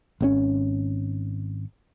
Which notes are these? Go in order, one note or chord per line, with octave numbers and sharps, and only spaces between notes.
G#1 B2 C#4